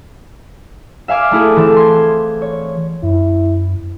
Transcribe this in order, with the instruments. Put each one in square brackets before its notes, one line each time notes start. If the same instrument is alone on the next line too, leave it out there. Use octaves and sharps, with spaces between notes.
[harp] E5 F5 G#5 D6 F6
A3 E4 G#4
E3 C4 A4
C6 G#6
C#5
[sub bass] F#2 [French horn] E4